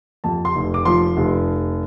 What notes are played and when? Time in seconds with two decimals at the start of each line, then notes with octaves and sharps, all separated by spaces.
0.24 F2 A5
0.45 C6
0.55 F1
0.74 D6
0.85 F3 C6
1.17 F1